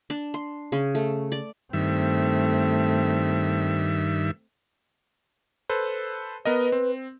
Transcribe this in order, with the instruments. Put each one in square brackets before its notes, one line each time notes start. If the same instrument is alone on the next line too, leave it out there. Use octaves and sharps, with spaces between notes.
[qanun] D4
C6
C#3
A3
D5
[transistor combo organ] G2 D#3 E5 [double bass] A3 C4
[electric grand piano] A4 B4 C5
[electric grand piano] B3 A#4 D#5 [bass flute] B4
[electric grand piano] C4